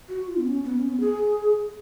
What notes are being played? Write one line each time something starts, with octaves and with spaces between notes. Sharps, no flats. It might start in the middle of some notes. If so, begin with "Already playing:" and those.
F#4
F4
B3
C#4
B3
C#4
B3
G#4